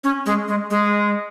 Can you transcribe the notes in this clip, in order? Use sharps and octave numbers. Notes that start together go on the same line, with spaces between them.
C#4
G#3
G#3
G#3